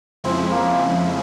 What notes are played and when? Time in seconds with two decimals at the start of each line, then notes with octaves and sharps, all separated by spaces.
0.24 F2 C#3 F3 G#3 C4 E4
0.51 A#3